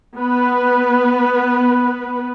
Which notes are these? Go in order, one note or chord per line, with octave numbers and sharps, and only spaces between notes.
B3 B4